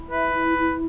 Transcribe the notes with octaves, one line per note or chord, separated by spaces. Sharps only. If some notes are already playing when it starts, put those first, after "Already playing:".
Already playing: E4
B4 E5
E4
E4